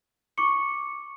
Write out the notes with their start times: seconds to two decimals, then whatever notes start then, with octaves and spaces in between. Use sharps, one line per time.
0.37 C#6 D6 C#7